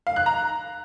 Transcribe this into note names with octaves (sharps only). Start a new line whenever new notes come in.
F5
F#6
A#5